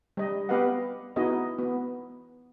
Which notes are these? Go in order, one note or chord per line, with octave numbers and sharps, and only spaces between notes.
G3 D#5
B3 G4 B4 D#5 F5 F#5
B3 D#4 E4 F#4 G#4 D#5
B3